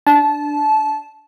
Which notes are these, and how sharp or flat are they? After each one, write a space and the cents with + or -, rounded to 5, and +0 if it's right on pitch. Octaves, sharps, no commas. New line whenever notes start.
D4 +0 A5 -20